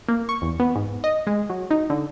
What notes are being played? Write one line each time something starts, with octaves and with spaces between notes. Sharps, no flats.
A#3
C#6
E2
B3
G#2
D#5
G#3
F#3
D#4
D3